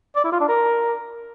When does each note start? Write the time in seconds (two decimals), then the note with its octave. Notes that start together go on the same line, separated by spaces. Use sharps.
0.16 D5
0.24 E4
0.32 F4
0.40 D4
0.48 A#4